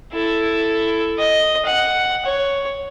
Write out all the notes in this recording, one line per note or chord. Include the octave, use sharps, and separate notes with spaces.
E4 A4
D#5
F#5
C#5